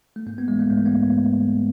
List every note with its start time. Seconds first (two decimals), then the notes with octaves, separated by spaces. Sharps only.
0.16 A3
0.26 G#2 A#3
0.38 B3
0.48 E3 G#3
0.59 A3
0.70 G#2 A#3
0.85 B3